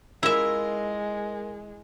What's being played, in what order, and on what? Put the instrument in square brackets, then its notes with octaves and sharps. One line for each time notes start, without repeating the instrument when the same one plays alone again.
[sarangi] G#3 [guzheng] E4 E5 [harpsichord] F4 A#4